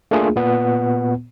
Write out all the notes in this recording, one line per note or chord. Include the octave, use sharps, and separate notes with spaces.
A3 A#3 D4 F4 G#4
A#2 B3